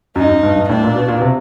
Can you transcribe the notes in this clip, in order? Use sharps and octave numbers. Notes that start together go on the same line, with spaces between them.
F#2 D#4
F#2
G2
G2
A2 D4
A#2
B2
A#2
B2
C3